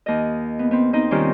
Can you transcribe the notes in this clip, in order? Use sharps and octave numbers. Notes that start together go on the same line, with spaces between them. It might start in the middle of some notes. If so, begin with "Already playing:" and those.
D#2 D#5
B3
B3 C4
C4 D#4 D#5
C3 D#3 G3 C#4 F4 G4